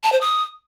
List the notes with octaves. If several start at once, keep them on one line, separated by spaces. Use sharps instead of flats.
A5
C5
D#6